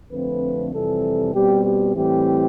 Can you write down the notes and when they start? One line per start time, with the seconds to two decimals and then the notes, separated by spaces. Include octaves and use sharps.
0.11 F2 D3 F3 A3 C4 B4
0.72 F2 C3 E3 G3 A4
1.34 B2 G3 C4 G4
1.65 G4
1.96 A2 E3 G3 C4 G4